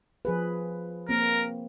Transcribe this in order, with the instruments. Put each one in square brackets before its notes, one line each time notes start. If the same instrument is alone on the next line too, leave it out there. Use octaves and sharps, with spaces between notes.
[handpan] F3 G#4 B4
[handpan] A#3 C4 [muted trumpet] A#4